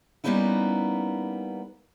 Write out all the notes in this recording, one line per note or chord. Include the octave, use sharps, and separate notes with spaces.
G3 A#3 B3 C#4 D#4 E4